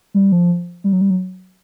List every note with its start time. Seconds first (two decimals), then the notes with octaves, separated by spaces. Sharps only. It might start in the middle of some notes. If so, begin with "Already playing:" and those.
0.14 G3
0.32 F3
0.84 G3
0.93 F#3
1.01 G3
1.10 F#3